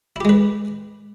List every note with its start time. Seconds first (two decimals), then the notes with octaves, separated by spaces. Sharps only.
0.16 E4
0.20 G4
0.25 G#3
0.29 B4